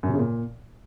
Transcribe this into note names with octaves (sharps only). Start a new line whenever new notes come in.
F#2
C3
C#3
A#2